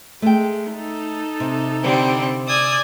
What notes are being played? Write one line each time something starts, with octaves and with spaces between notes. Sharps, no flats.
G#3 A3 G5
D#4 A4
C3
D3 G3 C4
D5 G#5 D#6 E6